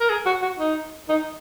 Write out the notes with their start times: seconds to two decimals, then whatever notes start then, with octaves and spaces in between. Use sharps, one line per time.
0.01 A#4
0.09 G#4
0.26 F#4
0.42 F#4
0.59 D#4
1.09 D#4